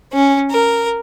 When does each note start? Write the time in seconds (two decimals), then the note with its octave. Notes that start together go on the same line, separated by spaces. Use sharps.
0.13 C#4
0.50 A#4